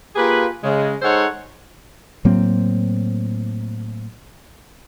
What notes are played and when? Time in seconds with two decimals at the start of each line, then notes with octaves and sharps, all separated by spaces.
0.15 A#3 F4 G4 G#4 B4
0.64 C#3 G#3
1.02 G#3 D#4 A4 C5 C#5 F#5
2.25 A2 F#3 A#3 C4